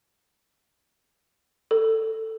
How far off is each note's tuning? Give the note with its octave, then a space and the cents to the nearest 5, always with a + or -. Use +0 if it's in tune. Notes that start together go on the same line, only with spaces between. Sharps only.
A4 +15